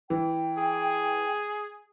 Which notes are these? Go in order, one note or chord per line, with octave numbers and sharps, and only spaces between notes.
E3 G5
G#4